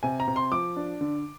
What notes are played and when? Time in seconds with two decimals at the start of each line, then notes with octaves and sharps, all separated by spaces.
0.03 C3 G#5
0.20 A#5
0.28 C3
0.36 C6
0.52 F3 D6
0.76 D4
1.01 D3